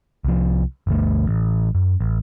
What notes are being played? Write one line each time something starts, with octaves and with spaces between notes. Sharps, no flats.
C2 F3
G1 D2 A3
A1
F#2
A1